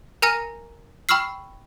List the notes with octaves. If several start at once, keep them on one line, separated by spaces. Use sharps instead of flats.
A#4 G#5 A#5 F6 A#6 D#7
G5 B5 C#6 E6 F6 C7